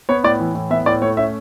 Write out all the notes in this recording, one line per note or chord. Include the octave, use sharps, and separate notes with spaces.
B3 C#5
A2 D5
E3
A2
B3 E5
A2 D5
A3 C#5
C#4 E5